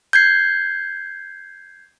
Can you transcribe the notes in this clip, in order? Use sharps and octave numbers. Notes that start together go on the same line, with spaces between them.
G6 G#6 C7